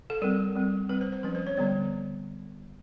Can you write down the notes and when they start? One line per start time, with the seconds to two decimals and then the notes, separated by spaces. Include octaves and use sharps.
0.10 A4
0.22 G3 C4 A#4
0.56 G3 C4
0.89 G3 C4 B4
1.01 C5
1.12 C5
1.23 F3 G#3 C#4 B4
1.35 C5
1.47 C#5
1.57 D3 G3 B3 D5